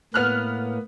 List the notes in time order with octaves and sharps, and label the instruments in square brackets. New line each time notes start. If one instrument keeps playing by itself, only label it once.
[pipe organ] A2 A#3 [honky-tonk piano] B3 F6 F#6